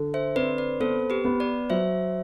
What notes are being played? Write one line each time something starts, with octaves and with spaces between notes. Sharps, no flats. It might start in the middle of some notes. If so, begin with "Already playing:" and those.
Already playing: D3
C5 E5
C4 B4 D5
B4 D5
B3 A4 C5
G4 B4
B3
B4 D5
F#3 C5 E5